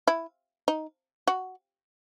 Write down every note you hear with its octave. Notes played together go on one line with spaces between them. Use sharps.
E4
D#4
F#4